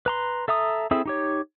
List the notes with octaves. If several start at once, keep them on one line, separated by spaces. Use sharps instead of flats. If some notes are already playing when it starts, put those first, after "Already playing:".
B4 A#5 C6
A4 E5 A#5 D#6
C4 E4 G#4 A4 E5
D#4 G4 C#5